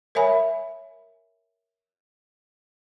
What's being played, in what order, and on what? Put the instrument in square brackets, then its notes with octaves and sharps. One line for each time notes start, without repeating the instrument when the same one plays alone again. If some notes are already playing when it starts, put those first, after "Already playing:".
[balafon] A#4 C#5 E5 G#5 B5